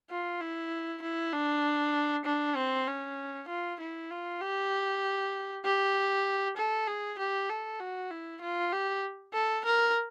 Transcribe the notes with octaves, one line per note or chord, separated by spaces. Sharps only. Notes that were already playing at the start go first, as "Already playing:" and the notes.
F4
E4
E4
D4
D4
C4
C#4
F4
E4
F4
G4
G4
A4
G#4
G4
A4
F#4
E4
F4
G4
A4
A#4